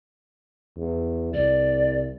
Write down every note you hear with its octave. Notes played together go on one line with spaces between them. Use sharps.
E2
C2 D5